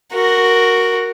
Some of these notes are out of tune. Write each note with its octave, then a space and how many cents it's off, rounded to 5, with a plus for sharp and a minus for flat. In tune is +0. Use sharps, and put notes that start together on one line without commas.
F#4 +0 A#4 +0